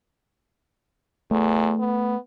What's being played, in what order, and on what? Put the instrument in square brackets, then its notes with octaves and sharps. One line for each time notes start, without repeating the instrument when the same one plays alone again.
[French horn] E2 [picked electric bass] A3
[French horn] B3